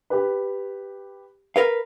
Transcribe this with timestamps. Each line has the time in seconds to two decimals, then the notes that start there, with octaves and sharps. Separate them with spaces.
0.10 G4 B4
1.56 A#4 B4 F5